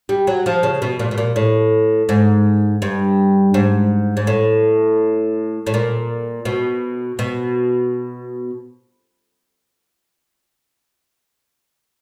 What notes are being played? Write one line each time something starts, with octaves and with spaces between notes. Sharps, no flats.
G3
F#3
F3
C#3
B2
A#2
B2
A#2
A2
G#2
G2
G#2
G#2
A2
A2
A#2
B2
B2